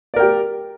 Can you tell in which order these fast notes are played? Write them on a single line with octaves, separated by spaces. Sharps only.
D5 A#4 G5 G4